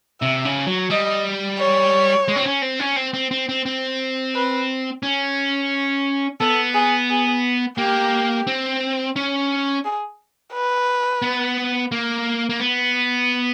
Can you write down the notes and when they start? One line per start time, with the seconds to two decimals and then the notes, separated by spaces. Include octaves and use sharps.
0.21 C3 E5
0.45 C#3
0.67 F#3
0.90 G3 D#5
1.60 C#5
2.28 G#3
2.36 C4
2.46 C#4
2.62 C4
2.79 C#4
2.96 C4
3.14 C4
3.31 C4
3.49 C4
3.66 C4
4.35 B4
5.03 C#4
6.40 B3 A4
6.74 G#4
7.10 G#4
7.78 A#3 G4
8.47 C4
9.16 C#4
9.85 G#4
10.54 B4
11.22 B3
11.92 A#3
12.50 A#3
12.60 B3